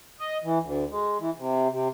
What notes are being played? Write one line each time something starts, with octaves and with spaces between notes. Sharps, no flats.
D#5
E3
D2
G#3
E3
C3
C3